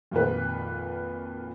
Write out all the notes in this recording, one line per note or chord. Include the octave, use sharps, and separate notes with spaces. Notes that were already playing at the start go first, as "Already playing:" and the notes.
G#1 F2 A#2 B4